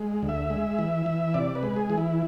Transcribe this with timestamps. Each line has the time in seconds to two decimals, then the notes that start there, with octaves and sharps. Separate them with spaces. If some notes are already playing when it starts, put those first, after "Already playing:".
Already playing: G#3
0.23 D2
0.29 E5
0.50 G#3
0.79 E3
1.06 E3
1.34 C3 D5
1.55 B4
1.63 G#3
1.76 G#4
1.90 E3
1.98 E4